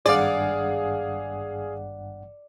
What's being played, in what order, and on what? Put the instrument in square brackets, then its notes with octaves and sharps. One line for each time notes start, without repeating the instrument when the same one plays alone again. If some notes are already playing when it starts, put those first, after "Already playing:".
[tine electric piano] G#1 G2 F#5 [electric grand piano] G#4 F5 [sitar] D5